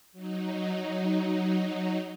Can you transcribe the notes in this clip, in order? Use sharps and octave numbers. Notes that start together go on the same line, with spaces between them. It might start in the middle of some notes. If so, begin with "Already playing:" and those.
F#3 D#4